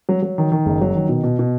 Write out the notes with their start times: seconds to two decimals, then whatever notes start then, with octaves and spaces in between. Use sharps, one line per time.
0.09 F#3
0.22 F#3
0.38 D#3
0.52 D#3
0.66 F#1
0.81 F#3
0.95 D#3
1.09 B2
1.24 B2
1.39 B2